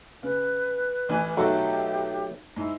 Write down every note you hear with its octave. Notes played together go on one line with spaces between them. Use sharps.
C#3 B4
A1 E3 G#5
B1 F#3 A3 G4 A4 F#5
G#2 E4